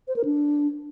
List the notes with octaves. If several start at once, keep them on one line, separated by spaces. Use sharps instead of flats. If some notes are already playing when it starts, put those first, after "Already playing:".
C5
A#4
D4